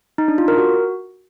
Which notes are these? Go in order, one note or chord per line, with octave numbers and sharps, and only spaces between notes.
D#4
D4
F4
A#4
F#4